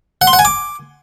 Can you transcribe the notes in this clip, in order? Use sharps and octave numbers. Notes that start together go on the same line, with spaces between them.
F#5
C6
F#5
G#5
D6